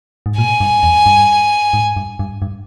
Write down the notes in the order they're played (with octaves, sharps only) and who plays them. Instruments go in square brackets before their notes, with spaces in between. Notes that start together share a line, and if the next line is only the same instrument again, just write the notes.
[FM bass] G#2
[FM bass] A#2 [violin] G#5
[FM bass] G2
E2
G2
G#2
G2
G2
G2